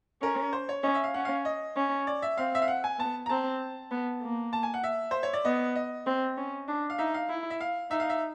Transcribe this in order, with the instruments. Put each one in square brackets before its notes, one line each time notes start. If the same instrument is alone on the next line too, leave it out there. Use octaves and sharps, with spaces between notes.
[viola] C#4 [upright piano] A#4
[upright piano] C5
C#5
[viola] C#4 [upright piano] D#5
[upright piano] E5
F5
[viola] C#4 [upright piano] F#5
[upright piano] F5
D#5
[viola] C#4
[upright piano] D5
E5
[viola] C4 [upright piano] F5
[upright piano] E5
F5
F#5
G#5
[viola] B3 [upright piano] A5
[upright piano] A#5
[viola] C4 [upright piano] A5
[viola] B3
A#3
[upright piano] A5
G#5
F#5
E5
C5
C#5
D5
[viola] B3 [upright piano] D#5
[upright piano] D#5
[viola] C4
C#4
D4
[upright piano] F5
[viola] D#4 [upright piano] E5
[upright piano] F5
[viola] E4
[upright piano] E5
F5
[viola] D#4 [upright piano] E5
[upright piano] F5
E5